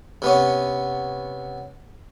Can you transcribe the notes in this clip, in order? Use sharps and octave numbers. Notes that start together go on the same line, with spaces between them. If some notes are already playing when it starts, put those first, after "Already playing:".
C3 B3 C#4